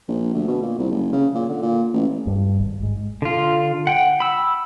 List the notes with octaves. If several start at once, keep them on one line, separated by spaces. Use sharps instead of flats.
A#1
D2
B2
A#2
C2
F#1
C#3
A#2
D3
A#2
A1
G2
G#1
G#2
D3 F4
F#5 G5
B5 E6